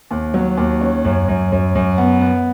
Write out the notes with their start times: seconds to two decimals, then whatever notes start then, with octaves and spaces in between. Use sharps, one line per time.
0.11 D#2
0.34 F#3
0.57 D#2
0.81 C#4
1.05 F#2
1.28 F#2
1.52 F#2
1.75 F#2
1.98 B3
2.21 B3